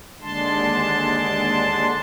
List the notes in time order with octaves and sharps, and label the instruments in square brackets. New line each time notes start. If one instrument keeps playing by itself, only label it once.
[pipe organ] D#2 D3 G#3 D4 A5 C6